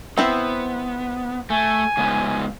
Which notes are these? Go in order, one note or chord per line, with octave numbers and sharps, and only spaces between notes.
B3 C4 E4 C5
A3 G#5
C#3 G#3 B3